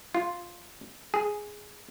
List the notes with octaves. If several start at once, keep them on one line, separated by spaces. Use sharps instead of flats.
F4
G#4